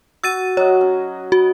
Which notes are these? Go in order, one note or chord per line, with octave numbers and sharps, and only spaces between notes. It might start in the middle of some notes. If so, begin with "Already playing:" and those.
F#4 E6 A6 D#7
F#3 C#5 D#5 A#5
C#4
F#4